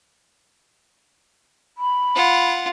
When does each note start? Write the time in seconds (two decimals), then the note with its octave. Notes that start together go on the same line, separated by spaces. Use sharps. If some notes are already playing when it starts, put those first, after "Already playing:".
1.78 B5
2.15 F4 F#5